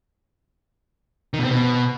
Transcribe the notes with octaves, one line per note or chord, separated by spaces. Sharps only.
D#3
B2
C4
B2